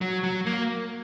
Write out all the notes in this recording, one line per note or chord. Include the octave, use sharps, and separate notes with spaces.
F#3
F#3
A#3